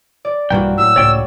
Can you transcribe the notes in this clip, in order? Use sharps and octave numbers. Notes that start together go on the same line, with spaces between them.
D5
B1 G2 E3 A#3 F#4 G5
A2 F3 F#3 E6
C#2 A2 C#5 D5 G5